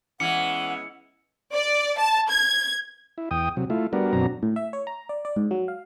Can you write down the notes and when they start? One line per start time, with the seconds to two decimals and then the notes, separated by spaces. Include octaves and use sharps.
0.20 E3 G#3 B3 C#4 F#5 C#7
1.53 D5
1.98 A5
2.31 G#6
3.18 E4
3.31 E2 G5 D#6
3.57 C3 F#3
3.70 A3 E4 F4
3.93 G3 B3 D4 F#4 A#4
4.13 F#2 B2 F#3 C4 D4 A#5
4.43 A2
4.56 E5
4.73 C#5
4.87 A#5
5.09 D5
5.25 D5
5.36 G#2
5.51 F#3
5.68 F5